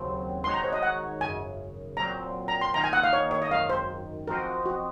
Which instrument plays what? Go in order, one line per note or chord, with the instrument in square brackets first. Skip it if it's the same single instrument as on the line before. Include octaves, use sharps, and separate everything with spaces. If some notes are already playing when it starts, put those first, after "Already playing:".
Already playing: [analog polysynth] D#2 C#3 F#3 C4
[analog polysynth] D#3 G#3 D#4 F#4 C#5 [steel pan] C6
[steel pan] A#5
C5
D#5
F#5
[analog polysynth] G#1 F#2 C#3 [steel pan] G#5
[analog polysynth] A#2 F#3 C4 [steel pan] A#5
[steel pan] A#5
C6
[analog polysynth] D#3 A#3 D#4 [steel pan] A#5
[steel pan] G#5
F#5
F5
C#5
C#5
D#5
[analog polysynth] G#1 F#2 D#3 [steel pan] F5
[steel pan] C5
[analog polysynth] F3 C4 F#4 C5 D#5 [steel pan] A#4
[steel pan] F#4